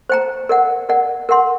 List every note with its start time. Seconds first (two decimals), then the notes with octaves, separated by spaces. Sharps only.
0.09 C5 G5 A#5
0.49 A#4 D5 F#5
0.89 A#4 D5 F#5
1.29 A#4 F#5 C6